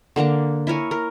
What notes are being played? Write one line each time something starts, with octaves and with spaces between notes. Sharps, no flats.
D3 A#3 D4 A#5
E4 A#4 C#5 G#5
A#4